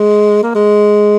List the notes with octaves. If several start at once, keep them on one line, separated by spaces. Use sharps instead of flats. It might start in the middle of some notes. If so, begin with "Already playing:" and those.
Already playing: G#3
A#3
G#3